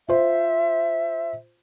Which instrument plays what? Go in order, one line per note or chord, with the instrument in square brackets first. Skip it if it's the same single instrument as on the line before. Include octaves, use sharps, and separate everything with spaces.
[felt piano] F4 C5 [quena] E5